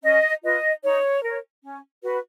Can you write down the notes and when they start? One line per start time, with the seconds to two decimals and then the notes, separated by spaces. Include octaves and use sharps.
0.03 C#4 D#5
0.43 F4 B4 D#5
0.83 D#4 C#5
1.22 A#4 C#5
1.63 C#4
2.03 F#4 B4